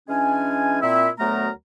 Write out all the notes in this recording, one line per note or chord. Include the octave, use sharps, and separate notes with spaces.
E3 G#3 C#4 D4 G#5
A#2 C4 E4 E5
D2 F#3 A3 B3 A#4 A#5